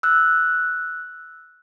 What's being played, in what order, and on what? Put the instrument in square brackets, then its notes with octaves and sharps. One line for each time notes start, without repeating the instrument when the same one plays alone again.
[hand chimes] E6 F#6